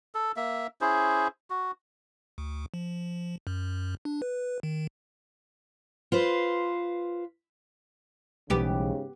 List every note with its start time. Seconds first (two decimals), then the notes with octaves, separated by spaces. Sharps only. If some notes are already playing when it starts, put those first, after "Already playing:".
0.15 A4
0.37 A#3 E5
0.81 C#4 E4 G#4 C5
1.50 F#4
2.38 D2
2.74 F3
3.47 F#2
4.05 D4
4.22 B4
4.63 D#3
6.12 F4 B4 C5
8.50 B1 G#2 C#3 E3 G3 A3 B3 G4